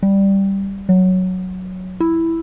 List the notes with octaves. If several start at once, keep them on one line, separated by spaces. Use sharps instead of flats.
G3
F#3
E4